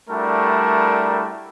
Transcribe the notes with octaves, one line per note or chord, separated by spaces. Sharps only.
G3 A3 D4 E4 F#4 A#4